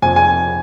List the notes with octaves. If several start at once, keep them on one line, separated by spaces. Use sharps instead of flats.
F2 G#5
G#5